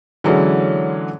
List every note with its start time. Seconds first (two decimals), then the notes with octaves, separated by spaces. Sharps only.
0.24 D3 E3 F#3 G#3 C#4